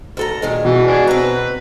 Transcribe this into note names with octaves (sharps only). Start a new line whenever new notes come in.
D2 A4 A#5
A#2 D#3 G#3
B2 E3
D4 G#4
C4 B4 A#5